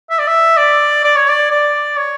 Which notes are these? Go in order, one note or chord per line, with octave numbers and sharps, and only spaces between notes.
E5
D5
E5
D5
D5
C#5
D5
D5
C#5